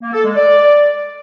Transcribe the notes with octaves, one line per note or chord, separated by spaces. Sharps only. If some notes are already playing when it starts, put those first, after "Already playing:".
A#3
A4
G#3
D5